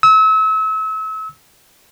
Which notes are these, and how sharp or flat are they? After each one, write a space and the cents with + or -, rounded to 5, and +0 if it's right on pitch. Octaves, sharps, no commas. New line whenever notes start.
E6 -35